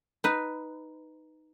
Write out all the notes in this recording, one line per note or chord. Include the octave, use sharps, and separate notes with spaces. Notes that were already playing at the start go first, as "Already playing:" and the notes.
D#4 B4